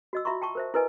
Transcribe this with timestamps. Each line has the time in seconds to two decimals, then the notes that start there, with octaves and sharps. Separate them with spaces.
0.13 F#4 D#5 E6
0.25 F4 E5 A#5 C6 C#6
0.42 G5 A5 C#6
0.55 A#4 C5 E5
0.74 E4 A#4 B4 D#5 G#5